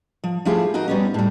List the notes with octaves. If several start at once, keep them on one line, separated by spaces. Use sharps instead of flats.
F3
F3 A3 E4 F4 G4 G#4
D#4 F#4 A#4 D#5
G3 B3 C#4
A2 G3